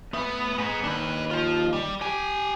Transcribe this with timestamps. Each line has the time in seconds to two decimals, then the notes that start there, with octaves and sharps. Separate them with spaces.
0.14 A3 B3 B5
0.58 G#2 B3
0.84 D#2 D4 B4
1.31 F3 F4
1.73 G3
2.02 G4 A4 G#5